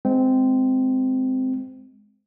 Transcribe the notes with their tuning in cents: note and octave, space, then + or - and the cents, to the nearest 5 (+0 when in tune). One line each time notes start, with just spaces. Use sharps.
G#3 +0 C4 -15